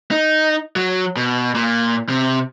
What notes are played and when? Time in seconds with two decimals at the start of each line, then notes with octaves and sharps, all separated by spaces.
0.11 D#4
0.76 F#3
1.16 B2
1.55 A#2
2.09 C3